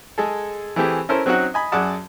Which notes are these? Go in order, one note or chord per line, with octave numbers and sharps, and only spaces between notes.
G#3 G#4 A4
E3 A3 C4 G4 G#4
C#4 E4 A4 A#4 C5
F#3 C4 C#4 D#4 F#4 F#5
D#5 G#5 B5
F#2 G#4 D5 F#5 A5 D#6